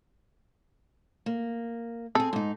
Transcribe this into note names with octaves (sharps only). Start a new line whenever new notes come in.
A#3
C4 G#4 A4
G#2 D#4